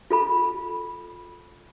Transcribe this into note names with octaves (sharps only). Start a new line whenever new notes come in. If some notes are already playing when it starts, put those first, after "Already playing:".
F4 A4 B5